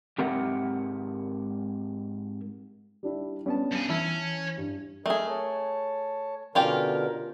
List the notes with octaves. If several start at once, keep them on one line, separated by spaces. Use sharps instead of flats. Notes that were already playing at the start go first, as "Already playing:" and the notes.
G#2 C4 G4 A#4 E5 F#5
G3 D4 E4
G3 B3 C#4 D4 A5
G2 G#4
E3 C#4 E4 A5
G2
A3 G#4 A#4 D#5
C#5 A5
B2 D3 C#4 F4 G4 A#4